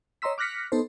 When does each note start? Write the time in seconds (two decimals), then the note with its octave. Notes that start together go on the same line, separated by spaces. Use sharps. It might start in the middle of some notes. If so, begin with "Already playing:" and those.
0.22 C#5 D#5 A#5 C6 E6 B6
0.38 D6 F6 F#6 A#6 B6 C#7
0.72 B3 D#4 A4 C5